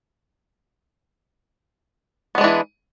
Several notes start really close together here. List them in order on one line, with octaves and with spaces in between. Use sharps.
B3 G#3 D4 E3